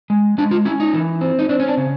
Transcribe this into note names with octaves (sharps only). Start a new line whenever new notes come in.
G#3
G#3 D4
F4
C#4 E4
D#4
E3
C4
D#4
C4 D4
C#4
D4
C#3